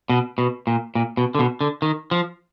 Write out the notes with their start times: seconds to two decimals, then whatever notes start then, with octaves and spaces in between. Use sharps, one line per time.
0.09 B2
0.38 B2
0.67 A#2
0.95 A#2
1.17 B2
1.35 D3
1.39 B2
1.61 D3
1.82 D#3
2.11 F3